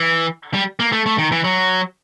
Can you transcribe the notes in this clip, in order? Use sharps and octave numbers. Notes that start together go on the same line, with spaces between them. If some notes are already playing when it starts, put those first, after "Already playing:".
Already playing: E3
G3
A#3
A3
A3
D#3
E3
F#3